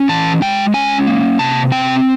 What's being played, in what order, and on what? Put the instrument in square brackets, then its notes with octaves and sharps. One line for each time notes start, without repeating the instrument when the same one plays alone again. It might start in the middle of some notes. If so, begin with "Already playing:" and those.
Already playing: [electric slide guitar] C#4
E3 A5
G#3 G5
C#4 G#5
A#3
C3 A5
C4 G5